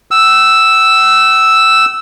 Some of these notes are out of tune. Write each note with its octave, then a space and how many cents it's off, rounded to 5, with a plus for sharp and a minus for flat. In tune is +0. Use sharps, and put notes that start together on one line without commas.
F#5 +45 E6 +0